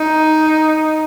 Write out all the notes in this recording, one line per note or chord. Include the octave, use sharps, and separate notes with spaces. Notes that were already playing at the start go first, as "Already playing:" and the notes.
Already playing: D#4